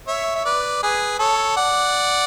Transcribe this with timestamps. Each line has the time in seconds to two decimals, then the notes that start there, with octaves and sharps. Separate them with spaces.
0.07 C#5 E5
0.35 E5
0.45 B4 D5
0.83 G#4 B4
1.19 A4 C#5
1.57 D5 F#5